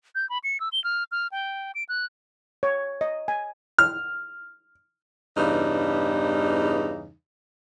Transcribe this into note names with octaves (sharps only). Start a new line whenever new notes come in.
G6
B5
C#7
E6
G7
F6
F6
G5
D7
F#6
C#5
D#5
G#5
F6
E2 G2 C#3 E3 G3 D#4